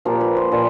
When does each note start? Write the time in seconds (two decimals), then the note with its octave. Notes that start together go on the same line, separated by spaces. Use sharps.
0.05 A#2 F3 A#3 G4
0.21 B4
0.37 C5
0.52 A#2 F3 D5